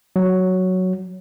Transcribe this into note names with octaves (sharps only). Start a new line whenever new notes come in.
F#3